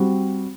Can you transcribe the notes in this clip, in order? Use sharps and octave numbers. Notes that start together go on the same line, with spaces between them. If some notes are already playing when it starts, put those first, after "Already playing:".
Already playing: G3 C4 F#4